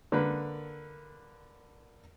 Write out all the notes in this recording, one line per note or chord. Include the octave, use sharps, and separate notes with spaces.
D3 A#3 A#4 B4